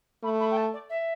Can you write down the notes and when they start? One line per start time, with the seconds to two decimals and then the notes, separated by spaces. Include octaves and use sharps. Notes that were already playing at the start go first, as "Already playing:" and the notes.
0.23 A3 B5
0.40 B5
0.51 G5
0.57 A5
0.73 D5
0.90 E5